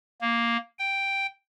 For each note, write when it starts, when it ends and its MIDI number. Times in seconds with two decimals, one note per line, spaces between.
0.21 0.57 58
0.79 1.27 79